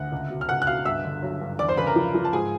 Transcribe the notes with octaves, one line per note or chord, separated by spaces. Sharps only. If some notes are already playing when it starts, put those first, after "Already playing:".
Already playing: D2 F#5 F#6
C#2
B2
F6
C#2 F#5 F#6
F#6
B2 F5 F6
G2 E5 E6
D3
F#3
G2
E2 D5 D6
C5 C6
C#3 B4 B5
A#4 A#5
F3
F3
A5
G#2 G#4 G#5